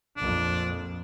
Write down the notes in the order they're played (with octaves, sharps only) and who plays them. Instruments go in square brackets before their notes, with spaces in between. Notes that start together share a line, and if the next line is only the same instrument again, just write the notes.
[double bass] A#1 F2 [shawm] D4